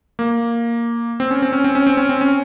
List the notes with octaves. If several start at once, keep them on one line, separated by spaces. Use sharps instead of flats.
A#3
C4
C#4
C4
C#4
C4
C#4
C4
C#4
C4
C#4